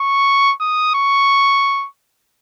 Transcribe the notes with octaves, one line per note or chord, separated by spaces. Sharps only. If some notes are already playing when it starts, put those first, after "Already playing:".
Already playing: C#6
D#6
C#6